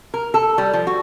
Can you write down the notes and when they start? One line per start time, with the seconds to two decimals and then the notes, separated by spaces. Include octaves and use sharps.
0.14 A#4
0.34 A4
0.58 G3
0.73 F3
0.87 F#4